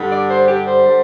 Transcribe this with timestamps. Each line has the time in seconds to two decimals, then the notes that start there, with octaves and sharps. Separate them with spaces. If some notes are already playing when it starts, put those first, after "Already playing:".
Already playing: G2 D3 G3
0.10 D5
0.29 C5
0.47 G4
0.66 C5
0.86 D3 G3